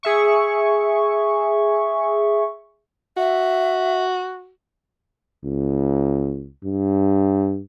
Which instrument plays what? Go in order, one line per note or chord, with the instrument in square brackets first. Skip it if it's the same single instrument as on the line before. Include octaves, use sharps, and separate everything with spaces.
[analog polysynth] G#4 E5 C#6
[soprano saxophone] F#4 [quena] E5
[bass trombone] C#2
G2